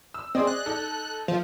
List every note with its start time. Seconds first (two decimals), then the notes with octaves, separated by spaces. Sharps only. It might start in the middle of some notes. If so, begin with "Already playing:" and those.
0.14 E6
0.35 C4 G#4 D5 D#5
0.47 F#6
0.66 D#4 A4
1.28 F3